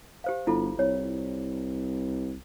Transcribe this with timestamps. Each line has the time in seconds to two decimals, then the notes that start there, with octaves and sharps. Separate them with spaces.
0.24 G4 C5 F5
0.47 G1 E4 F4 A4
0.79 C2 C#5